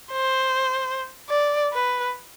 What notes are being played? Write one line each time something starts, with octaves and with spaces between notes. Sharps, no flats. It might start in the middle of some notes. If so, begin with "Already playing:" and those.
C5
D5
B4